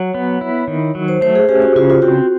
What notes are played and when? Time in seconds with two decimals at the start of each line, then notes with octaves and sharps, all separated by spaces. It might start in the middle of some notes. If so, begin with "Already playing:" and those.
Already playing: F#3 C#5
0.14 B3
0.41 E4
0.68 D#3
0.95 F#3
1.08 C5
1.21 A3 C5
1.35 G#4
1.49 C#4 G4
1.62 F#4
1.76 C#3 F4
1.90 F4
2.02 C4 F#4